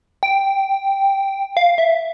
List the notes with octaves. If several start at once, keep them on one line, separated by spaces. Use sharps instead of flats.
G5
F5
E5